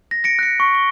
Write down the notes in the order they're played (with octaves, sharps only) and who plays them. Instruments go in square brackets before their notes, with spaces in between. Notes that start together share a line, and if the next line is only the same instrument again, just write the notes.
[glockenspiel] A#6
A#6 C#7 D7
F#6 B6 C#7
C#6
G7